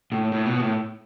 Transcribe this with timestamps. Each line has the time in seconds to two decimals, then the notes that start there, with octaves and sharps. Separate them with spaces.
0.12 A2
0.32 A2
0.46 B2
0.59 A2